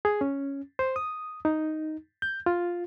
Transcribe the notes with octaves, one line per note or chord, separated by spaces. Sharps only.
G#4
C#4
C5
D#6
D#4
G6
F4